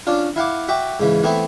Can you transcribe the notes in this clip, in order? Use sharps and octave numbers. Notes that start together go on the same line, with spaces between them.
C#4 D4 F4
E4 F5 F#5 D6
F#4 E5 G5 D6
G#2 C#3 E3
E3 A3 B3 C4 E4